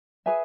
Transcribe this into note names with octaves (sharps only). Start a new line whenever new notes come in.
G#4 B4 E5 G#5